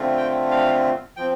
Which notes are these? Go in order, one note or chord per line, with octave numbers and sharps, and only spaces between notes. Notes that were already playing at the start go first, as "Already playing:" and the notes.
Already playing: D3 A3 C4 F4
G5
F5
F3 C4 G5